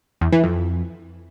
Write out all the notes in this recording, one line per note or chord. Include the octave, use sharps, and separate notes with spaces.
E2
E3
F2